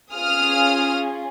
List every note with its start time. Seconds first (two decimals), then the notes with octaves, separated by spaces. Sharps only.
0.14 C#4 F4 G#4 D#6 F6